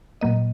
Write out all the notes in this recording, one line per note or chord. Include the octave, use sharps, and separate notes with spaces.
A#2 F#3 A#3 D#5